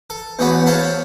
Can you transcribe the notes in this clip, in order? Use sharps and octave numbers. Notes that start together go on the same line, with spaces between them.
A4
E2 A3 B3 C#4 F#4 B5
A4 C5 C#5 F5 A5 B5